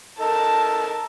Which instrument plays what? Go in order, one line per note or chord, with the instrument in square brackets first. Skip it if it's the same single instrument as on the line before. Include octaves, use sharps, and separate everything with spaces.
[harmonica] D#4 A4 A#4 [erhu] A5